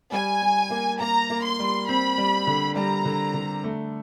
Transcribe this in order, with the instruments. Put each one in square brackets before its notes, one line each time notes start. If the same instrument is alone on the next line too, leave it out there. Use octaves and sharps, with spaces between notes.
[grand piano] G3 [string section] G#5
[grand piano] G3
A#3
[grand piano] A#3 [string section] A#5
[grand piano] A#3
[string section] C6
[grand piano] G3
[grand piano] C4 [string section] B5
[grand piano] G3
D3
[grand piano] G3 [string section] A#5
[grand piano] D3
D3
A3